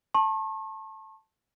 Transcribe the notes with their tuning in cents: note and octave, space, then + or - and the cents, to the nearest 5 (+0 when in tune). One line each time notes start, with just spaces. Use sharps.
A5 +0 C#6 -40